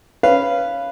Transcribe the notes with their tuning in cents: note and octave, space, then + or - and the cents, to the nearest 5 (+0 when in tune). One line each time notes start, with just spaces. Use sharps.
C#4 +5 B4 +0 F5 -15